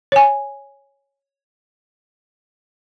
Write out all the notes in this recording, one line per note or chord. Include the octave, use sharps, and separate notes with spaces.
C#5 G#5